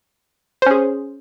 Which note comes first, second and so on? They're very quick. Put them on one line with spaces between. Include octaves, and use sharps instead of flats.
C5 C#4 G#4